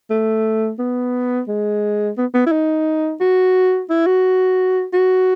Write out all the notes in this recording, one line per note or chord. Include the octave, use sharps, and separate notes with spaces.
A3
B3
G#3
B3
B3
E4
D#4
F#4
E4
F#4
F#4